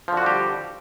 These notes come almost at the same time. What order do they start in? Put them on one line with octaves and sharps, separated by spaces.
F3 D3 F#4 G3 G4